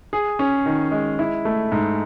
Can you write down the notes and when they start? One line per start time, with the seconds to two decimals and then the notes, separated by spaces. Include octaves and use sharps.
0.13 G#4
0.39 C#4
0.66 D#3
0.91 G#3
1.19 E4
1.45 A3
1.72 G#2